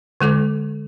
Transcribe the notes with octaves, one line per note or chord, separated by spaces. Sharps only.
D3 G#3 A4 D6